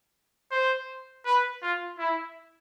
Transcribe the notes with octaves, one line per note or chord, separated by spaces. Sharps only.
C5
B4
F4
E4